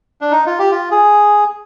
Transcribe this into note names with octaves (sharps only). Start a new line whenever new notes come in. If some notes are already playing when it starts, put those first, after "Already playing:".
D4
D#4
F4
G4
F4
G#4